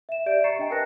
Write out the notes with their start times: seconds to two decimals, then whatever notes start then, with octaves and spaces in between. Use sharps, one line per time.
0.09 E5 E7
0.26 G4 D5 E5 G6 D7
0.44 A#5 C#6 A6 C7 C#7 E7
0.59 D4 D#5 G5 G#5 A#5
0.70 A#4 B4 G#5 A5 F#6 A#6